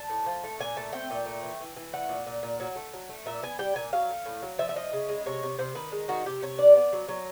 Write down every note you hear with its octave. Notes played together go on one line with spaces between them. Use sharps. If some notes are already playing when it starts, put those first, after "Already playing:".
Already playing: A5
A2
F3
A3
A#2 G#5
A3 A5
C4 G5
A#2
A3
E3
E3
E3
A3 F#5
A#2
A#2
A#2
F#3
A3
F#3
A3
A#2 E5
B3 G#5
G3 G5
A#2 G#5
F#3 F5
A3
A2
F#3
F3 E5
E5
F3 D#5
C#3
G#3
C3 C#5
C3
C3 C5
D#3 B4
G#3
D#3 F#4
C3 G4
C3 C#5
D4 D5
B3
F#3
F#3